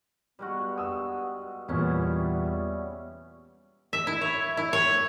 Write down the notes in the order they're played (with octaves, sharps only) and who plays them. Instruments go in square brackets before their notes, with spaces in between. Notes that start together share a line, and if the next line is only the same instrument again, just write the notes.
[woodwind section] G2 B3 [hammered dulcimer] G3 G#3 F#4
[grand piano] F#5 D#6 E6
[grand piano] E2 A#2 [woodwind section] G3 [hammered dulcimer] B3 C#4 E4
[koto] E5
E4
C#5
E4
C#5